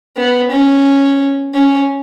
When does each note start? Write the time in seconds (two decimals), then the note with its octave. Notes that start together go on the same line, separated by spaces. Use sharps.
0.17 B3
0.51 C#4
1.54 C#4